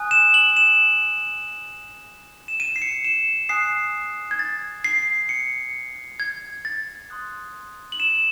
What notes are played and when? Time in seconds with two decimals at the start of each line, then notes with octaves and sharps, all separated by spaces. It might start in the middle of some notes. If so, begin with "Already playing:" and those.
Already playing: G#5 D#6 F#6
0.11 E7
0.34 F#7
0.57 E7
2.48 E7
2.60 D#7
2.76 C7
2.82 C#7
3.05 E7
3.49 G#5 D#6 F#6 C7
4.31 G#6
4.39 A6
4.84 C7
5.29 C#7
6.20 G#6
6.65 A6
7.10 C6 D#6 F#6
7.92 F#7
8.00 E7